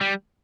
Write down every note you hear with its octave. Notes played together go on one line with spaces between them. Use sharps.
G3